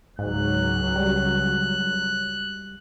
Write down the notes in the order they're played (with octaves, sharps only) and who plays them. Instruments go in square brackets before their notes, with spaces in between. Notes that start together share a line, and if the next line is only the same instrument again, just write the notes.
[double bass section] C#2 F#3 [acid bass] G#2 [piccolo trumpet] F#6
[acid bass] G3